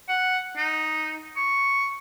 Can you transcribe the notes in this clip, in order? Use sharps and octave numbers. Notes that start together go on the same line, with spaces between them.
F#5
D#4
C#6